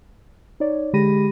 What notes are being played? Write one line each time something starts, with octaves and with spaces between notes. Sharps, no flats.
D#4 C#5 D5
D3 G#3 G4 B5 A#6 D#7